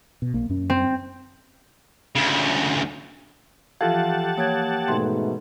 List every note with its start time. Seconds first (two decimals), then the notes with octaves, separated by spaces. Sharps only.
0.22 B2
0.34 A#1 A#3
0.49 F#2 C#4
0.70 C4
2.15 D2 C#3
3.81 E3 F3 F4 G4 A4 F5 F#5 A5
4.38 A#3 C#5 G5 G#6
4.88 G#2 B2 A3 E5 C6